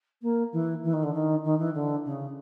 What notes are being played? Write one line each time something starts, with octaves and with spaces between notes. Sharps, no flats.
A#3
E3
E3
D#3
D3
D#3
D#3
E3
D3
C#3